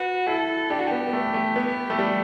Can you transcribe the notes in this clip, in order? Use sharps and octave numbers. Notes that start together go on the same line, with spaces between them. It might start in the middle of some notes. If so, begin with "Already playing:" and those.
Already playing: F#4 B4
E4 A4
D4 G4
F#4
B3 G4
B3
A3
A3
B3
A3
G3